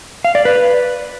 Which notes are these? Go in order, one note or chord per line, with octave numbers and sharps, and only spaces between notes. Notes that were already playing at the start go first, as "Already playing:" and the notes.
F5
D5
B4